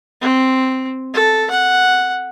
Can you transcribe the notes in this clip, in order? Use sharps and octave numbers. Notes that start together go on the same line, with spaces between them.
C4
A4
F#5